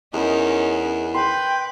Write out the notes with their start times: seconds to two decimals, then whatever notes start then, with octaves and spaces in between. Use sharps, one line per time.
0.14 E2 C#4 D#4 A#4 D#5
1.15 B4 G5 C6